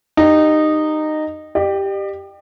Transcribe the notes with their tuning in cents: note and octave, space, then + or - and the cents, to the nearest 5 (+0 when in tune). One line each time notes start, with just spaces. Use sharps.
D#4 -15 G4 +0
G4 +0 D5 +45